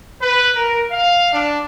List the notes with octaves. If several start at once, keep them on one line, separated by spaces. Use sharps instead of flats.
B4
A#4
F5
D4